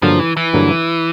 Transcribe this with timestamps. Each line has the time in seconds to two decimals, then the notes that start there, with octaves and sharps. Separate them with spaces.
0.02 G2 D3 F3 F#3 A#3
0.19 E3
0.37 E3
0.54 G2 D3 F#3 A#3